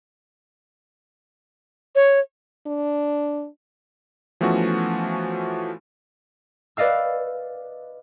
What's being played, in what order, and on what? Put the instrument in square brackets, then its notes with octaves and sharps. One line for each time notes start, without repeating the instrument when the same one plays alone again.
[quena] C#5
[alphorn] D4
[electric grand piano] E3 F3 A3 B3 C#4 F#4
[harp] B4 D5 D#5 F5 E6